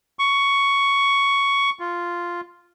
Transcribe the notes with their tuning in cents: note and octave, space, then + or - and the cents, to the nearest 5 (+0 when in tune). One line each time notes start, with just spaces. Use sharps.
C#6 +10
F4 -5